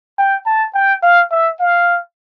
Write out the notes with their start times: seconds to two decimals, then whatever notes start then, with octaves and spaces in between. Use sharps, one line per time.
0.18 G5
0.46 A5
0.75 G5
1.02 F5
1.31 E5
1.59 F5